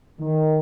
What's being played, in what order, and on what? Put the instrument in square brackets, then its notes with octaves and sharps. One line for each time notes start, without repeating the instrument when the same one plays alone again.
[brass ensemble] D#3